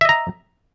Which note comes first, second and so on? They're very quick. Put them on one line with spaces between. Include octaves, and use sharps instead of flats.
E5 D#5 A#5